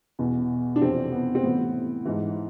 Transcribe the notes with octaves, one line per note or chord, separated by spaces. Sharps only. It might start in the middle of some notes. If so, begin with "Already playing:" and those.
E2 B2
D4
F2 C3 E3 C4
B3
C4
A2 E3 B3
G#2 E3